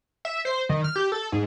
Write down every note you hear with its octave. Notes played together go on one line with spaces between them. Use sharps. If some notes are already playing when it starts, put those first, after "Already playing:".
E5
C5
D#3
F6
G4
A4
G#2